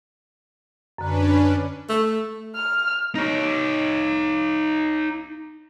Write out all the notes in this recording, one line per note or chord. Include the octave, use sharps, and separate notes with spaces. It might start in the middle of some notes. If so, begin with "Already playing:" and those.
F#2 D3 C#4 D4 B4
A3
F6
D#4 C#5